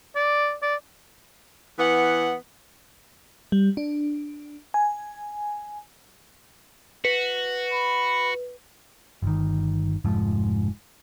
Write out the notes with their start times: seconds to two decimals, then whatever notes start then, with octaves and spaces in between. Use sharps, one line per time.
0.16 D5
0.62 D5
1.79 E3 B3 F#5
3.52 G3
3.77 D4
4.74 G#5
7.05 F#4 B4
7.73 B5
9.22 G1 D#3
10.05 F1 G#2 F3